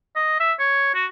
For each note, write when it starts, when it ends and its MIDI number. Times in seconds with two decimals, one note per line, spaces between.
0.16 0.38 75
0.40 0.53 76
0.60 0.93 73
0.95 1.06 66